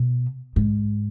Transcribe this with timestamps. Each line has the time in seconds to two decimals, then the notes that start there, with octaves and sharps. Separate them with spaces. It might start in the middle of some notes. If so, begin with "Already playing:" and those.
Already playing: B2
0.56 G#2